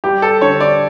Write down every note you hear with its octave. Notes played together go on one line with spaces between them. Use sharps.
G3 G4
A4
D3 C#5
D5